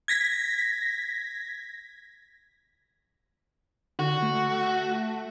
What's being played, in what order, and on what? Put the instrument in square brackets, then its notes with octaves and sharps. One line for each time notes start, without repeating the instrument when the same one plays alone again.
[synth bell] G#6 A#6 B6
[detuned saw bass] D3 [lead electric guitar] F#4
[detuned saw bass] A3